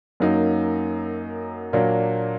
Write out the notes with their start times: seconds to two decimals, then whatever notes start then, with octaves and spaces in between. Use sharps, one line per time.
0.20 F#2 F#3 A#3 D#4
1.73 A#2 F#3 A#3 D4